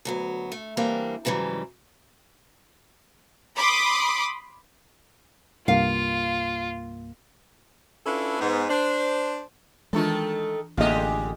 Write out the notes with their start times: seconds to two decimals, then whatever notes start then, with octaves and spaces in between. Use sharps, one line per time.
0.05 D2 F#3 B3
0.52 A3
0.77 E3 G3 A#3 C4 D4
1.25 G#2 C#3 E3 F#3 G3
3.56 B5 C6 D6 D#6
5.68 C2 G2 A#3 F4 F5
8.06 C#4 D4 E4 F4 A4 B4
8.40 G#2 B3
8.69 D4 C5
9.93 D#3 E3 G#3 A3 D4 F4 A4
10.77 A1 D3 G#3 A#3 F4 G4 D#5